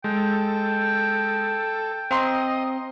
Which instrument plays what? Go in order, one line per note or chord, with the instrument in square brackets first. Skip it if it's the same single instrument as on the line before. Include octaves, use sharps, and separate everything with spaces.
[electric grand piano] G#3 [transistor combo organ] A4 [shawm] G5
[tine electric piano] C4 [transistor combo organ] D#5 [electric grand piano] F5 A#5 C6